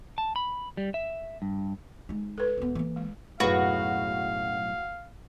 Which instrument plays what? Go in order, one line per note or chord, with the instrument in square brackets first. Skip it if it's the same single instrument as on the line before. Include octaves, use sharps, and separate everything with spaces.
[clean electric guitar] A5
B5
G3
E5
G2
[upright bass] G#3 D#4
[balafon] A4 B4
[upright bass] E1 B3
E3 A#3
[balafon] G#3
[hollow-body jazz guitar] B1 A2 [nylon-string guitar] F#2 G#4 B4 [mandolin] F#4 [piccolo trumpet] F5